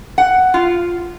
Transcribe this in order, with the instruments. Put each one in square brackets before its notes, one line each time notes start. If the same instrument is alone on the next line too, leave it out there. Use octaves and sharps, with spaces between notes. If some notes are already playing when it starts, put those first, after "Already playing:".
[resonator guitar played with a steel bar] F#5
F4